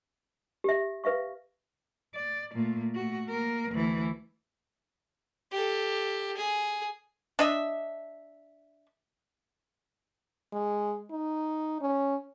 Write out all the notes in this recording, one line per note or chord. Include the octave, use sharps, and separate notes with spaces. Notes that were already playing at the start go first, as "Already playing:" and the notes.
G4 E5
B4 E5 F5 C#6
D5
A#2 A3
A3 F#4
A#3 A#4
D2 E3
G4 A4
G#4
D4 D#5 E5
G#3
D#4
C#4